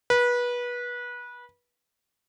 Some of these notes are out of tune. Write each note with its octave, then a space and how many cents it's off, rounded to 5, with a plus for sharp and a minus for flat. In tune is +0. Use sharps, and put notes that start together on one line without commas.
B4 -25